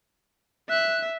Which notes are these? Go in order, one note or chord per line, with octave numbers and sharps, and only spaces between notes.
E5 F#6